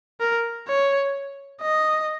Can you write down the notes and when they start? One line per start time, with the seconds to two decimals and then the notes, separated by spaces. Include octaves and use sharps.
0.20 A#4
0.68 C#5
1.61 D#5